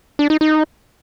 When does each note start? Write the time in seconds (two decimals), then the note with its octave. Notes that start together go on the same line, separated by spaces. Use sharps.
0.19 D4
0.30 D#4
0.41 D#4